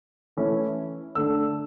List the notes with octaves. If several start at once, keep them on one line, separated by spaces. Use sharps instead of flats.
E3 A3 C#4 E4
D3 A3 D4 E6